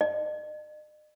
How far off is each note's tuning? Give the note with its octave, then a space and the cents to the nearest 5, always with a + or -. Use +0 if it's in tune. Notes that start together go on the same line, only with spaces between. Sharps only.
D#5 -45